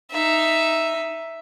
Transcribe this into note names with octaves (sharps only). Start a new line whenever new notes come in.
D#4 E5